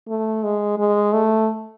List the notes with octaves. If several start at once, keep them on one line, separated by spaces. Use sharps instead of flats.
A3
G#3
G#3
A3